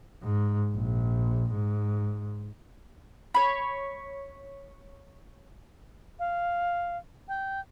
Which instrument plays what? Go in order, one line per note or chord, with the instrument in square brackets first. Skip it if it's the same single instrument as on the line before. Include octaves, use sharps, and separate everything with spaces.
[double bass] G#2
A#1
G#2
[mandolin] C#5 B5
[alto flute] F5
G5